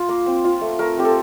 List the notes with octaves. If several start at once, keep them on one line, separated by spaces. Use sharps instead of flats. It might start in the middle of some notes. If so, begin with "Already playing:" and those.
Already playing: F4
A#3
C4
F4
A3
A3 A#4
C4 G4
A4